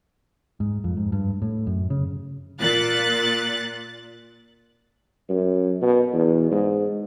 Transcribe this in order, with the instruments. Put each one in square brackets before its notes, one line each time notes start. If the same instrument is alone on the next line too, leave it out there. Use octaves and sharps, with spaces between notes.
[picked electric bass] G#2
F2
G#2
G2
A2
F#2
C#3
[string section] A#2 F#6 A6
[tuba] F#2
B2
E2
G#2